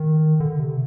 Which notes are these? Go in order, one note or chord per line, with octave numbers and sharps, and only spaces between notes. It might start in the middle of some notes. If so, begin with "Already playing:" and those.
Already playing: D#3
D3
C3